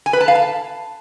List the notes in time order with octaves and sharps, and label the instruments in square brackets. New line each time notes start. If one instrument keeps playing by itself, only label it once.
[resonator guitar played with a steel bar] G#5
B4
A5
F5
A5